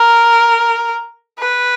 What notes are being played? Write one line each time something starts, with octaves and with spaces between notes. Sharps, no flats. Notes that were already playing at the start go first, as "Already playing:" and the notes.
Already playing: A#4
B4